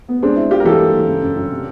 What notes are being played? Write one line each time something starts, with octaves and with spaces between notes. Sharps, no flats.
B3
G#3 C4 D4
E4
G#3 F4 G4
A#4
E3 G4 A4
A#3
E3
C#3
F#2
F#2
C3